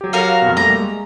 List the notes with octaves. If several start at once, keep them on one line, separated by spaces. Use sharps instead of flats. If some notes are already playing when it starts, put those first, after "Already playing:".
F#3 G4
F#4 A#4 F5
F2 B2
G3 A3 A#3 A#5
G#3